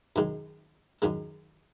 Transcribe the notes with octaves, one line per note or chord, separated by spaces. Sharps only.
F#2 D#3 G#3
F#2 D#3 G#3